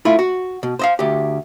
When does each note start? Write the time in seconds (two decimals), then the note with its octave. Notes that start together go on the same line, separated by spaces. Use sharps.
0.05 A3 E4 F4
0.19 F#4
0.63 B2
0.79 C5 D#5 F5
0.99 D2 G4